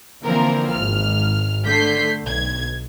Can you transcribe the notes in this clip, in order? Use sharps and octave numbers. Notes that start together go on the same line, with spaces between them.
D3 E3 F3 A#3 C4 A#4
G#1 F6
D3 A3 G6 B6 C7
B1 G#6